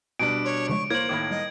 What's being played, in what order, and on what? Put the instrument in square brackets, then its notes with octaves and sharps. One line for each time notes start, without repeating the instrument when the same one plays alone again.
[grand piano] B2 G3 D4 [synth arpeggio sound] G#5 [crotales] D7
[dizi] C#5 [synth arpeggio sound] C6
[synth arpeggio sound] C#3 F3 G#3 [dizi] C#6
[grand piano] A#3 C5 [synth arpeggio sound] E4 [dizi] C#5 [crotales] G#6 F#7
[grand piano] A2 D#3 A#3 [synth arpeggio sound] B5 D6
[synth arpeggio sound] G3 [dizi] D#5